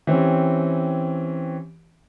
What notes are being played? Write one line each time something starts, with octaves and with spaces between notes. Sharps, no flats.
E3 C4 C#4 G4